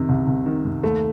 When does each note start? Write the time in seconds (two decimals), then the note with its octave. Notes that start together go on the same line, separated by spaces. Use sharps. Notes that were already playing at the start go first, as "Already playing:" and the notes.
Already playing: C3 D#3
0.09 C2
0.27 C2
0.46 D#3
0.65 C3
0.83 D#2 A3